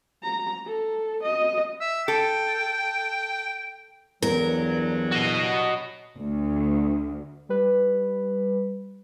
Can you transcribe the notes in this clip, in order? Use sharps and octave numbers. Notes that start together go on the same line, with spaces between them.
A#5
A4
D#5
E5
A4 G5
E2 G2 F#3 A#4
F#4 D#5
D2
G3 B4